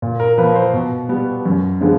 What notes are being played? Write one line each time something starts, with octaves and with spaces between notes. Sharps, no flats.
A#2
A#4
F3 A#3 B4
C5
B2
G3 B3
F#2
D3 F3 G#3 B3